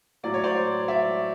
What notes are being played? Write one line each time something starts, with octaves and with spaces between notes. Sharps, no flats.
A2 F#3 D5
C#5
C5 D5
D5 E5